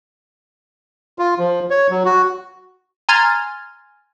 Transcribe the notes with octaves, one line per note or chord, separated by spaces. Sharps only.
F4
F3
C#5
F#3
F#4
G#5 A#5 C6 F6 G#6 A6